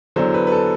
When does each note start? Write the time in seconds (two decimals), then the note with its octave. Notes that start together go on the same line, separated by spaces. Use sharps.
0.16 E2 D3 F#3 C5
0.34 B4
0.47 B4
0.52 A4